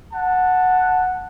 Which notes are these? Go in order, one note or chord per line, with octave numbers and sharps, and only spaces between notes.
F#5 A5